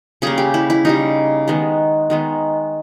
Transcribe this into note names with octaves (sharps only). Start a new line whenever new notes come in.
C#3 G3 A#3 G#4
G4
E4
E4
C#3 G3 A#3 D#4
D#3 G#3 B3
D#3 G#3 B3